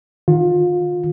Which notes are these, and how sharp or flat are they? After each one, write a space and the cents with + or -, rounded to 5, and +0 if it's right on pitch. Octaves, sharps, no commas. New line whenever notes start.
D#3 -10 F4 +25